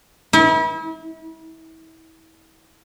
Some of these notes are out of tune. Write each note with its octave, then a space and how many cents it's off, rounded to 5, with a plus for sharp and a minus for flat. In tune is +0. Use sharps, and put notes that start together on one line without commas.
E4 -35